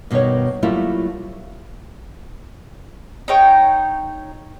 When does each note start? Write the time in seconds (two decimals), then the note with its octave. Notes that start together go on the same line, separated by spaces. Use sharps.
0.11 G2 B2 D#3 B3 C#5
0.63 F#3 G3 A3 A#3 E4 F4
3.28 D#4 C#5 G5